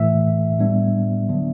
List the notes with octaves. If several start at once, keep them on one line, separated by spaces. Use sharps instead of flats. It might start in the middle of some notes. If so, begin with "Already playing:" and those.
Already playing: A2 E3 A3 E5
A2 G3 B3 D4
D3 F#3 B3 D4